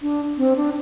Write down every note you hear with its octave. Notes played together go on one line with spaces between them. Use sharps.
D4
C4
D4